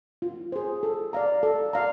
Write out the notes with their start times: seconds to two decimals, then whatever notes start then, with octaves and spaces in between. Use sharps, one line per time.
0.22 F4
0.52 G#4 C5
0.83 A4
1.13 D5 F5 A#5
1.43 A4
1.73 D5 F5 A#5